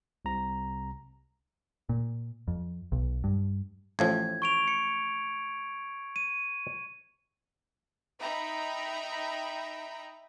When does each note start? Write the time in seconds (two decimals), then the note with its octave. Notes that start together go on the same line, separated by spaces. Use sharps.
0.25 C2 C3 A#5
1.89 A#2
2.48 F2
2.92 B1
3.24 G2
3.99 A1 A2 F3 G#6
4.42 C#6 D7 F7
4.68 C#7
6.16 D#7
8.21 D#4 E5 G5 A#5 B5